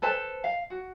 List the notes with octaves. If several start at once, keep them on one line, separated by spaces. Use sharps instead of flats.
A4 B4 C5 A5
F5
F#4